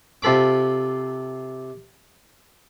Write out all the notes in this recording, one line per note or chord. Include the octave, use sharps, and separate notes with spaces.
C3 F4 A4 B5 D6